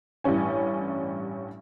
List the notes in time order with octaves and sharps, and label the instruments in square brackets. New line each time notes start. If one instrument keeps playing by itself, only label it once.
[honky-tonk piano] A1 G2 G3 C#4 G#5